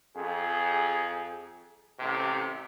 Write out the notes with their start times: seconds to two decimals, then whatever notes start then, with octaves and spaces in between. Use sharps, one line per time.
0.16 F2 G#4
2.00 A1 C3